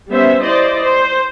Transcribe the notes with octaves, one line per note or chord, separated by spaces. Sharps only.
G3 B3 C#4 C5 E5
E4 C5 D5 D#5
C5